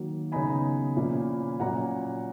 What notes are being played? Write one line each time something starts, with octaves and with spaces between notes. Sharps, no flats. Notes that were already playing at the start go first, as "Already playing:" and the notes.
Already playing: D#3 F#3 A#3
C#3 F#3 B3 D#4 G#5 B5
A#2 F3 A#3 C#4
A#2 F#3 C#4 F#5 A#5